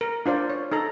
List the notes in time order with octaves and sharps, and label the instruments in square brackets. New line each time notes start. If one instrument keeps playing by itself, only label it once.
[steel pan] A#4
D4 F4 C5 D5
C#5
D#4 A4 A#5